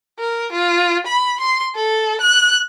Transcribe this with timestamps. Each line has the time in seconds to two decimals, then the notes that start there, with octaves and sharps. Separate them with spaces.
0.19 A#4
0.53 F4
1.07 B5
1.41 C6
1.76 A4
2.21 F#6